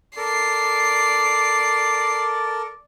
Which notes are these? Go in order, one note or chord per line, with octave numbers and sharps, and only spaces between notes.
A4 A#4 D5 C7